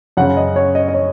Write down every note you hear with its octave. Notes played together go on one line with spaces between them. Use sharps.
F#2 C#3 F#5
D#5
C#5
D#5
D#5
C#5